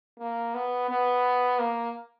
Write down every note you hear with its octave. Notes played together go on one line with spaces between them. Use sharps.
A#3
B3
B3
A#3